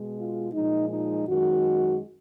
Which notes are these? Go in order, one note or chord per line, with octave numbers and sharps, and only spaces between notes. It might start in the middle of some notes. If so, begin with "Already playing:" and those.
Already playing: B2 G#3
F4
A#2 F3 G#3 D#4
D#4
F#2 D#3 G#3 F#4